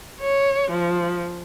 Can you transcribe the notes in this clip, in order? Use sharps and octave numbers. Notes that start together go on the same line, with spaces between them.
C#5
F3